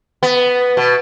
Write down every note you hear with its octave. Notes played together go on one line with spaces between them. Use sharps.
B3
B2